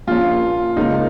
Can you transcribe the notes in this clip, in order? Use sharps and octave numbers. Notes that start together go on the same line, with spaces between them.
A#1 A#2 F3 A#3 C#4 F4
C#2 C#3 A#3 D#4 F4